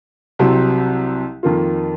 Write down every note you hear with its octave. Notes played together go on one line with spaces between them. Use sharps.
C2 C3 F#3 C4
F2 D#3 A#3 F4